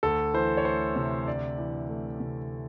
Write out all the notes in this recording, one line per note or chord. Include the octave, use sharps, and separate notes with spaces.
D2 A4
E3 C5
C#5
A3 C5
C3
D2 D5
E3
A3
C3